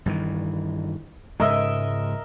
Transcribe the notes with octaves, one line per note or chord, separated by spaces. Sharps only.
G2 D#3 E3
G#2 C#3 G#3 A#4 D#5 E5